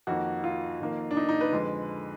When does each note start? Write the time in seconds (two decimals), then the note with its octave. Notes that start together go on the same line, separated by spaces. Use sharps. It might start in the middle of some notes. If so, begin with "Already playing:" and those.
0.07 F2 D#3 A#3 F#4
0.44 F4
0.80 F2 D#3 A#3
1.11 D4
1.17 D#4
1.29 D#4
1.41 B4
1.52 F2 D3 G#3